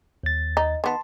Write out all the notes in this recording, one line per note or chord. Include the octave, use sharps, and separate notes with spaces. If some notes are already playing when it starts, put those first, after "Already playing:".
D#2 A6
D#4
D#3 B3 A5 C6